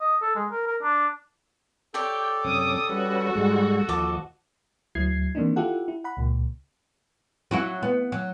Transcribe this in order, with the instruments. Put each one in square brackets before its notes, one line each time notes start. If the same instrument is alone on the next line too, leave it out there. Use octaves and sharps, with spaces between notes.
[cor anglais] D#5
A4
G#3
A#4
A#4
D4
[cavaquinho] G4 C#5 D5 [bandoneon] A4 [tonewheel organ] G5
[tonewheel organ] F#2 C3 C#4 [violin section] D6 D#6
[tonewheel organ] G3 C#4 B4 [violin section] F#4
[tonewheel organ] G#2 G3 G#3
[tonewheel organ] D#2 F3 D#5 [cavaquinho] A5 D6
[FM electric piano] D2 F#3 E4 G#6 C7
D#3 E3 A#3 C4 D4 D#4
E4 F4 G4 A4 F#5
E4
F#5 B5
C#2 A#2
[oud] F#3 E4 F#4
B3
F#3